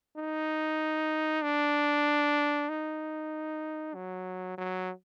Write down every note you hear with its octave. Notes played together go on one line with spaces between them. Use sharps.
D#4
D4
D#4
F#3
F#3